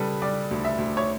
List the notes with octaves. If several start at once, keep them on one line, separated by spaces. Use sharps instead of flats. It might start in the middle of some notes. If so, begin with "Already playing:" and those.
Already playing: C#3 G3 A4 B4
G3 D5
D2
E5
D2
C#5